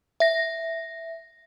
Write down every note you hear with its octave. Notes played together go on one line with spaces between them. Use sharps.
E5 A#6